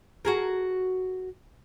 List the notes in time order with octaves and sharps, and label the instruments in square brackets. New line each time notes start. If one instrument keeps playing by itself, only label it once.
[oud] F#4 G#4 A#4